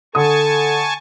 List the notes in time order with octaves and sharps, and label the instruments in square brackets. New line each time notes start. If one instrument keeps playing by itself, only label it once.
[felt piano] D3 D#6 [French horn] A4 [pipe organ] G#5 A5 C#6